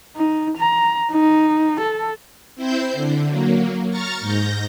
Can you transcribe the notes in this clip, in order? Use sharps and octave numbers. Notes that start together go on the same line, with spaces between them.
D#4
A#5
D#4
A4
C4 E4 C5 G6
D3
F#3 A#3
A#5 C#6 F6 A6
G#2 G6 A#6